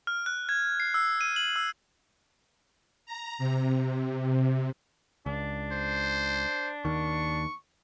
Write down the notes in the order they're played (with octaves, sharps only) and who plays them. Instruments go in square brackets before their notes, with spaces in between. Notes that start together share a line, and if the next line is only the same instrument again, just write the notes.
[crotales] F6
F#6
G#6
C7
E6
D#7
F#7
E6
[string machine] A#5
C3
[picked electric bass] C#2 [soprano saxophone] D4
[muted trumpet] C5
[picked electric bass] D#2 D#3 [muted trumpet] C#6